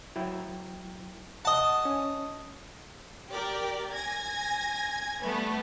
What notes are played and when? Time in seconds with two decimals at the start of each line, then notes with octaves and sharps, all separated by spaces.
0.16 F#3 E4 G5
1.45 D#5 F#5 A5
1.85 C#4
3.31 G4 A#4 D5 G5
3.92 G#5 G#6 A#6
5.22 G3 A3 B3